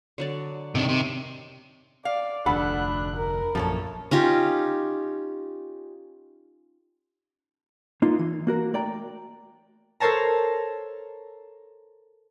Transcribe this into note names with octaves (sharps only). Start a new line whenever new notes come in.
D3 F#3 D5
C3 D#3 D4
C3
D5 F5
F1 D2 D4 A4 F#5 B5 F#6
A#4
A#1 F#2 F3 A4 C#5
C#4 D#4 F4 G4
A#3 D#4 F4
E3
A#3 F#4 A#4
A3 D5 G5 A#5
A4 A#4 C5 C#5 A5 A#5